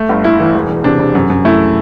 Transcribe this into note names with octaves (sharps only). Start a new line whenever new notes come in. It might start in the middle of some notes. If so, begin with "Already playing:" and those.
Already playing: A3
G1
A3 E4
E3
E1
E1
C3 D4
C3
F#2
F#2
A3 E4